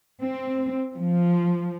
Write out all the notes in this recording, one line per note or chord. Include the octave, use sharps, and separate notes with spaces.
C4
F3